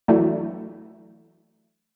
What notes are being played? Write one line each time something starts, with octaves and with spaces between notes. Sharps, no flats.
E3 F#3 A3 D4